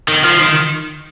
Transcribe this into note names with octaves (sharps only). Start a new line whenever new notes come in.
D#3
F3
D#3